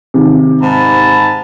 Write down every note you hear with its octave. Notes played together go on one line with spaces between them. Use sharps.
C3 D#3
G#2 A5 B5